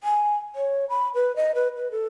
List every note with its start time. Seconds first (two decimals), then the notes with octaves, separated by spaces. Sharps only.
0.04 G#5
0.56 C#5
0.90 B5
1.15 B4
1.36 D#5
1.55 B4
1.77 B4
1.91 A4